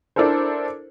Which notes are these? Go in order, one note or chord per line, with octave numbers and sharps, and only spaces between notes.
D4 E4 A4 A#4 C5